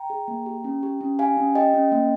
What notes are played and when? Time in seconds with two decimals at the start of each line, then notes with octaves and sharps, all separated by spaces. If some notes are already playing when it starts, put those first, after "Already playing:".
Already playing: G5 A#5
0.10 G#4
0.28 A#3
0.46 G4
0.64 C#4
0.83 G4
1.01 C#4
1.19 G4 F5 G#5
1.37 C#4
1.55 G4 D#5 G5
1.74 C#4
1.92 A#3